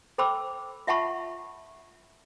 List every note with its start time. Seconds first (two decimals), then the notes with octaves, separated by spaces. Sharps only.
0.18 A4 C5 G5 B5 D6 E6
0.87 F4 E5 F#5 A5 B5 C#6